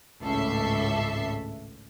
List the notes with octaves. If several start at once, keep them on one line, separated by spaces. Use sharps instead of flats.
G#1 C#2 A2 A4 E5 C7